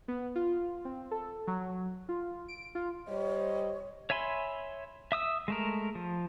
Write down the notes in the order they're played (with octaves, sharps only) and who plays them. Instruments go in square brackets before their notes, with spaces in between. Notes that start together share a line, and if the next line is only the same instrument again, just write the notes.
[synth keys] B3
F4
C4
A4
F#3
F4
D7
F4
[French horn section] G3 C5 D#5 [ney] C#5
[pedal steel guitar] C#5 E5 G#5 B5 C6
E5 D#6 E6
G#3 A3 A#4
F3